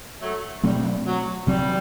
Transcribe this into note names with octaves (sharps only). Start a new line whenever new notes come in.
F#3 A3
B2 F#3 G3 A3 C4
F#3
C3 F#3 G3 C4